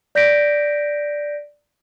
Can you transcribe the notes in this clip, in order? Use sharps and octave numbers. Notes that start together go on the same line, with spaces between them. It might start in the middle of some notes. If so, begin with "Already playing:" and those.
D5 G6 A#6 B6 D7